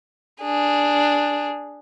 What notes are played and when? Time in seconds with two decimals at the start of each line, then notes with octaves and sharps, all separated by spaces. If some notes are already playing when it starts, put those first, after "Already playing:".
0.42 D4 G#4